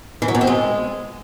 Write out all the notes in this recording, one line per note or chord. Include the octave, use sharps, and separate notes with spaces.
E3
F#3
B2
C4
G#3